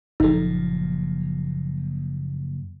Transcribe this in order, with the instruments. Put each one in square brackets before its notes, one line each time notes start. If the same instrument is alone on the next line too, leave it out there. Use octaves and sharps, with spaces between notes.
[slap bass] F#1 A#2 F3 [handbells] D#4 A4